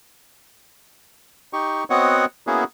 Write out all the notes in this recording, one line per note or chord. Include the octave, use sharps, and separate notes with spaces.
D#4 G4 C#6
B3 C4 F#4 C#5 D#5 F#5
A#3 B3 C#4 E4 F#4 G#4